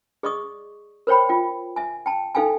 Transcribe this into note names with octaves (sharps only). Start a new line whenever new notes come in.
G#4 D5 D#5 C#6 D#6
A#4 C5 C#5 G5 B5
F4 G5
E5 G#5
G5 A5
D#4 A4 F5 G5 G#5